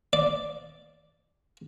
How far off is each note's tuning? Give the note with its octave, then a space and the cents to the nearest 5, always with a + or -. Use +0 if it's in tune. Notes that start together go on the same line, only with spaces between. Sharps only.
D5 -5